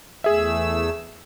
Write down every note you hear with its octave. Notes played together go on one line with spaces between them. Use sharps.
E2 A3 G#4 E5 E6